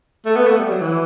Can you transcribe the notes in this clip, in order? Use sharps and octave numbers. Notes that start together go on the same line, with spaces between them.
A3
B3
A3
G3
F#3
E3